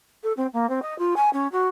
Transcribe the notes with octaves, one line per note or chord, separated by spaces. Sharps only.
A4
C4
A#3
C4
D#5
F4
G#5
C#4
F#4